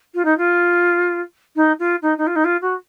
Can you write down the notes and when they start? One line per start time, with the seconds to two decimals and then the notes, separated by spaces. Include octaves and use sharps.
0.14 F4
0.25 D#4
0.38 F4
1.56 D#4
1.79 F4
2.02 D#4
2.18 D#4
2.27 F4
2.36 D#4
2.44 F4
2.61 F#4